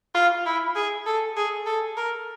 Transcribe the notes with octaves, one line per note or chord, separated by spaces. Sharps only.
F4
E4
G#4
A4
G#4
A4
A#4